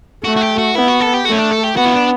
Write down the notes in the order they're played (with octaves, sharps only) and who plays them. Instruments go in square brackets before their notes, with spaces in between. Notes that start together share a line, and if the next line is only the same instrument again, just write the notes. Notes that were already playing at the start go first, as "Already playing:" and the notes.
[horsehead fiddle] A3 [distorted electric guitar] F#4
[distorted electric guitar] F#4
G4
F#4
[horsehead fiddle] B3 [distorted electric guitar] E4
[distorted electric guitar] F#4
A4
G4
[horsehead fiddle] A3 [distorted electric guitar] F#4
[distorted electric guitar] C#4
D4
A4
G4
[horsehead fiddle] B3 [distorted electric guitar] F#4
[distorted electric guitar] E4
D4